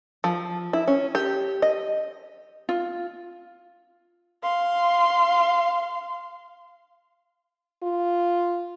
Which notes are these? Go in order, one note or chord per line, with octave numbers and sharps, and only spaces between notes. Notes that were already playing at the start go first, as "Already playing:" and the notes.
F3
E4
C#4
G4
D#5
F4
F5 C6
F4